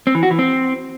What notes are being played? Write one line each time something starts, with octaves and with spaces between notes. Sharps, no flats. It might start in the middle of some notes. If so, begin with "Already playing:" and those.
C4
E3
F#4
E3
C4